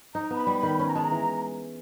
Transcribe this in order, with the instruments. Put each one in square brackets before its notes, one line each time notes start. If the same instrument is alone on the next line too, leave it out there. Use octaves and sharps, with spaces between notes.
[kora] D#4 [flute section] A#5
[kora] B3 [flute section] A#5
[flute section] B5
[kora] G3
[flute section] B5
[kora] D#3
[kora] C#4 [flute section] B5
[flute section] A#5
[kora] G#3 [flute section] A5
[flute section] A#5
[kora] E3